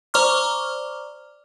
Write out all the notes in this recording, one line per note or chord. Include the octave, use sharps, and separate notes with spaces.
C5 D5 A#5 C#6 D6 F6